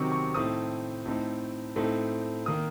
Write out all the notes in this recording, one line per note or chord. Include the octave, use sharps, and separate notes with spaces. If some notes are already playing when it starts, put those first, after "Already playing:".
Already playing: C3 D#3 F#3 C4 D#4 C#6
C#6
A2 A3 C4 D#4 D#6
A2 A3 C4 D#4
A2 A3 C4 D#4
D#3 A#3 D#6